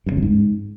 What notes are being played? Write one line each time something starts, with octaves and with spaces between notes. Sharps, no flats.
G2
C#3
F2
G#2